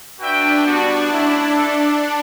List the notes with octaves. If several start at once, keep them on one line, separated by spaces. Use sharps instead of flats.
D4 F#4 B4 E5 G5
G3 B3 D4 F#4
A3 C#4 E4
E4 A4 E5